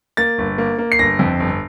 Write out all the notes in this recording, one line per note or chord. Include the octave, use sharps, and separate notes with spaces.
A#3 A6
G1
A#3
A#3
C7
G1 A#6
F2
G1